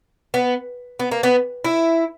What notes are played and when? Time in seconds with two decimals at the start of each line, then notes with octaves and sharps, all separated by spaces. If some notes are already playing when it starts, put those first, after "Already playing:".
0.34 B3
0.99 B3
1.11 A#3
1.23 B3
1.65 E4